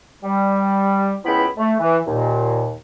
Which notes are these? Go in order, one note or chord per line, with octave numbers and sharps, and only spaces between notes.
G3
C#2 F3 B3 E4 G5 B5
A3
E3
D#2 A#2